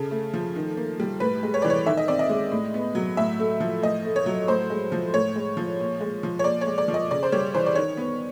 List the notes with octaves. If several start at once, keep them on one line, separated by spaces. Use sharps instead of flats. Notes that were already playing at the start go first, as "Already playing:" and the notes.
Already playing: C#3 A4
A3
F3
D#3
A#3
G3
A2 B4
G#3
C#5
E3 D5
C#5
D#3 E5
D#5
C4 D5
D#5
G#3
A2
B3
F#3
A2 E5
A3
F3
A2 D#5
A3
C#5
F#3
A2 C5
G#3
F3
A2 C#5
G#3
F3
A#2
G#3
F3
C#5
A#2 D5
C#5
G#3
D5
F3
D#5
C#3 D5
C5
G3 C#5
E3 C5
D5
D#3 C#5
B3